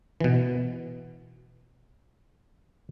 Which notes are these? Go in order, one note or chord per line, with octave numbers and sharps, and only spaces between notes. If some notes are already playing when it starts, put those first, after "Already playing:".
B2 E3